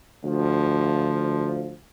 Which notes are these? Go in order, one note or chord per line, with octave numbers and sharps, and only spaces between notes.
D2 F3